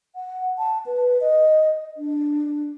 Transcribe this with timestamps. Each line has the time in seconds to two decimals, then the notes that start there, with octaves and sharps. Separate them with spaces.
0.15 F#5
0.58 A5
0.86 B4
1.21 D#5
1.97 D4